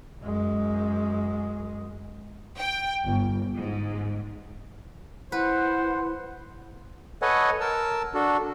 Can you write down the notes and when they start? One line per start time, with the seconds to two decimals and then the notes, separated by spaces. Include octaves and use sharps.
0.22 F#2 G#3
2.58 G5
3.04 G1
3.56 G#2
5.32 E4 B4 C5 F#5
7.22 A4 B4 C#5 D#5 F#5 G#5
7.61 A#4 A5 E6
8.14 D4 F#4 A4